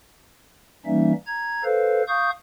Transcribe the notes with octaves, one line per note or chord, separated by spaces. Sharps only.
E3 G3 A#3 C#4 D#4 E5
A#5 G#6
A4 B4 C5 F5
F5 C#6 D#6 G6